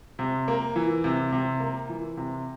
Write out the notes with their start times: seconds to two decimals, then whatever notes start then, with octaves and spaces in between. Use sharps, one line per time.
0.19 C3
0.48 A#3
0.76 E3
1.04 C3
1.32 C3
1.60 A#3
1.89 E3
2.17 C3